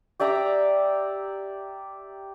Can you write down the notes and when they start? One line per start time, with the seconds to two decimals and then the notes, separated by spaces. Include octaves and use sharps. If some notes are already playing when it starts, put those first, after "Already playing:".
0.20 G4 D5 E5 A#5